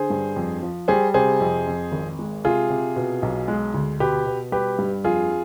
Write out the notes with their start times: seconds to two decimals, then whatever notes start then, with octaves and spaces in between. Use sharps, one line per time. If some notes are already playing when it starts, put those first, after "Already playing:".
Already playing: D3 G#4 C5
0.10 G2
0.36 F2
0.63 F3
0.88 G3 G#4 C5
1.14 C3 G#4 C5
1.40 F2
1.67 F2
1.92 G#1
2.19 G#3
2.44 C3 F4 G#4
2.70 C3
2.96 B2
3.23 B1
3.48 G#3
3.74 D2
4.00 B2 G4 B4
4.26 B2
4.52 G3 G4 B4
4.78 G2
5.04 F2 F4 G#4